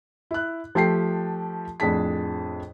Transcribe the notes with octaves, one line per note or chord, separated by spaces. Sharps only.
E4 F#6
F3 A3 G4 G5 A5 C7
F2 A2 D4 G#4 A5 B6